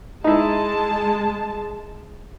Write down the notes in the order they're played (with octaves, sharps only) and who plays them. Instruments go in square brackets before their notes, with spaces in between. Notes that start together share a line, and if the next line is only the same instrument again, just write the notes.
[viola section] G#3 A5 [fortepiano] D#4 E4